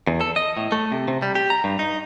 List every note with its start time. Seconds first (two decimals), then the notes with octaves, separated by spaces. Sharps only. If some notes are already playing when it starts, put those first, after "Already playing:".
0.07 E2
0.21 A4
0.36 D#5
0.57 A2
0.72 A3
0.92 C3
1.08 C3
1.22 G3
1.35 G4
1.50 A#5
1.64 G2
1.79 D#4